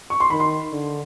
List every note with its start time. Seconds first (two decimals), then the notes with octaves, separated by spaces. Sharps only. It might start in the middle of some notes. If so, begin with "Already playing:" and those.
0.10 C#6
0.20 C6
0.30 D#3 B5
0.40 C6
0.73 D3